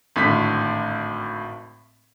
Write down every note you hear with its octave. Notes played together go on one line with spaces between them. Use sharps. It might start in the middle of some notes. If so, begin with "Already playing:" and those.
G#1 A2 D3 B6